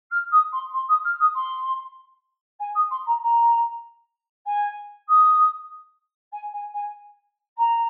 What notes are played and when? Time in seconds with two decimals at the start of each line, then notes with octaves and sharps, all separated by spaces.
0.11 F6
0.31 D#6
0.52 C6
0.73 C6
0.88 D#6
1.04 F6
1.20 D#6
1.35 C6
2.60 G#5
2.75 D#6
2.91 C6
3.06 A#5
3.22 A#5
4.46 G#5
5.08 D#6
6.32 G#5
6.53 G#5
6.74 G#5
7.57 A#5